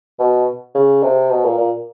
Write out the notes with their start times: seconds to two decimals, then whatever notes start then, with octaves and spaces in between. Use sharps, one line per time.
0.19 B2
0.75 C#3
1.03 C3
1.31 B2
1.45 A#2
1.58 A#2